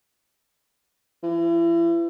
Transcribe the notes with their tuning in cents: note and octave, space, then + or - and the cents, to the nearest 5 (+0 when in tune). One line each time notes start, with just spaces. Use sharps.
E3 +35